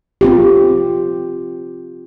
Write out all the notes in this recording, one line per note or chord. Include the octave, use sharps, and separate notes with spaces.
C4 F4 G4